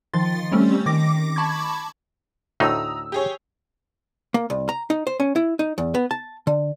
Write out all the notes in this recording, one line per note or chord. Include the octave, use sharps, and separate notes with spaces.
D#3 F3 C6 A6
G3 A3 C4 C#4 G4
D#3 D6 A#6
A5 B5 C#6 D6 G#6
D2 A2 D#4 A#5 D#6 E6
G4 G#4 C#5
A#3
C2
A#5
D#4
C5
C#4
E4
D#4
E2
B3
A5
D3